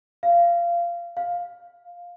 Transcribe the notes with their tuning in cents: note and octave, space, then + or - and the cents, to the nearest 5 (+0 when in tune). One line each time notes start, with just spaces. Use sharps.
F5 -20
F5 +10